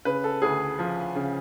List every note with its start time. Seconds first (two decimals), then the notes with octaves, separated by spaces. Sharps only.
0.05 C#3 B4
0.24 A4
0.42 D2 G#4
0.79 F3
1.15 C#3